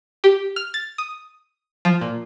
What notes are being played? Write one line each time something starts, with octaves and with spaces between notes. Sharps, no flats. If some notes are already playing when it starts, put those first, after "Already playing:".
G4
F6
A6
D#6
F3
A#2